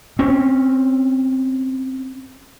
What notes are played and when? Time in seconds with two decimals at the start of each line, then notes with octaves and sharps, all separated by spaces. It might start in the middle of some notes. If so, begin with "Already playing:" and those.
0.19 C4 C#4